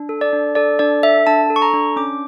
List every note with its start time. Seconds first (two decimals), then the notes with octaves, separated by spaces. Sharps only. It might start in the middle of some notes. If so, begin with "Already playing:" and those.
Already playing: D4
0.09 A4
0.21 D5
0.33 D4
0.55 A4 D5
0.79 D4 D5
1.03 A4 E5
1.27 D4 A5
1.50 A4
1.56 C#6
1.62 A#5
1.74 D4
1.96 C#4 D6